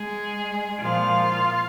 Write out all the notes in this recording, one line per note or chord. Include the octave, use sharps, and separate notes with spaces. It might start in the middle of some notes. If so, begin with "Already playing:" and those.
Already playing: G#3 G#4
A#2 F3 F4 F5